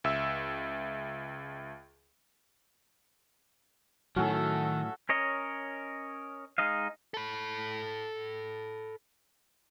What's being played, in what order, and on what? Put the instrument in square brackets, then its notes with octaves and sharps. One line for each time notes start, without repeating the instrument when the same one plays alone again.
[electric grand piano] C#2 E5 E6
[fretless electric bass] A2 F#3 [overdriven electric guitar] D#3 [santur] C#4 F#4 [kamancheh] A4 E5
[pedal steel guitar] C#4 A#4 C#5 D#5
G#3 D#4 D#5 F5
[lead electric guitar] A4 B5